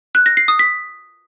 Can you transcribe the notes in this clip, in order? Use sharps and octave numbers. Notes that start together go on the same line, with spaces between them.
F#6
A#6
C7
D#6
B6